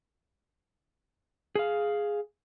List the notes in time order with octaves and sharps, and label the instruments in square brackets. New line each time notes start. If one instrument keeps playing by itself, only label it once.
[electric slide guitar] G#4 F5